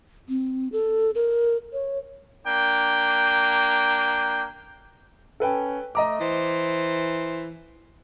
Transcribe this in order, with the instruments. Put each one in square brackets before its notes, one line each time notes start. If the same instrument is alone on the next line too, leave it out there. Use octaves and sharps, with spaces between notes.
[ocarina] C4
A4
A#4
C#5
[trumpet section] A#3 D4 G5
[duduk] C#4 [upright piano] A4 B4 G5
[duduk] A3 [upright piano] D#5 A#5 D6
[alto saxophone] E3 [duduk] C5